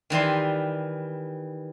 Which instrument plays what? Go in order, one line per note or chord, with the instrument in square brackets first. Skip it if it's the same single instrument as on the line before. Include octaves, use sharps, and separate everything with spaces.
[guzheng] D#3 E3 G3 C6